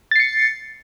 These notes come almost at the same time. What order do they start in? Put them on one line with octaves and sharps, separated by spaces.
A6 C7 C#7